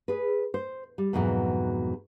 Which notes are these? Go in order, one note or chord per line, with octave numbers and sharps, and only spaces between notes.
G#4 B4
C5
G3
F2 G#2 B2 D3 E3 F#3